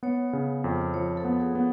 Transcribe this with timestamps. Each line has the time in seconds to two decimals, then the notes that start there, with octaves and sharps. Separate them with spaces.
0.03 B3 C#5
0.33 C#3
0.64 F2
0.94 F3 C#5
1.17 A4
1.25 B3
1.40 G#4
1.55 B3